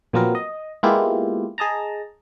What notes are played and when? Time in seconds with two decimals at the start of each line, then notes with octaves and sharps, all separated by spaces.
0.13 A#2 F3 F#3 B3 C4 A#4
0.35 D#5
0.83 G#3 A#3 B3 E4 F4 G4
1.58 G#4 D#5 A5 A#5